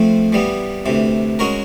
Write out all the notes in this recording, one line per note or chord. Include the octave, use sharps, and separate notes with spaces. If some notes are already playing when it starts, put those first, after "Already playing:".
Already playing: F3 A3 C4
E3 G3 B3
D2 C3 E3
G#3 C#4 F#4 A#4